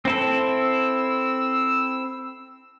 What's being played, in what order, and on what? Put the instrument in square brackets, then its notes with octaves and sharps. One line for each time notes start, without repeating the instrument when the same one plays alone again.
[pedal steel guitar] C4 E4 A4 [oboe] E6